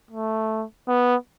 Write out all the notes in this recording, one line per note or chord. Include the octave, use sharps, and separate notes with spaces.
A3
B3